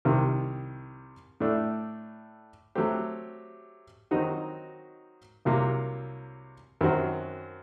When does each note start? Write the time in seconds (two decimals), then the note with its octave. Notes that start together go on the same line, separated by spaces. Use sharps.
0.05 C2 C3 D#3
1.40 A2 A3 D4
2.75 F#3 A3 C4 G4
4.11 D#3 F#3 C4 D#4 F#4
5.45 C2 C3 F#3 A#3
6.81 F#2 D#3 F#3 C4 F#4